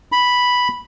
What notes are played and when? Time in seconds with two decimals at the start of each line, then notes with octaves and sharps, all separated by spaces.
0.12 B5